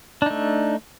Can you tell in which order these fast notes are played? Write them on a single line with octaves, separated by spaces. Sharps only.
D4 D#4 A3